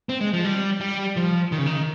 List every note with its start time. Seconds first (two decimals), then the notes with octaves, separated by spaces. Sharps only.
0.09 C4
0.21 G#3
0.33 F3
0.45 G3
0.81 G3
1.16 F3
1.52 D#3
1.58 C#3
1.66 D#3